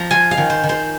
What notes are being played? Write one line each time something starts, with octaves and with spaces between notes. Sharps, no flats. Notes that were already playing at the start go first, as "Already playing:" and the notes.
Already playing: F3 A#5
F4 G#5
F5
D#3
C5
D#3
C5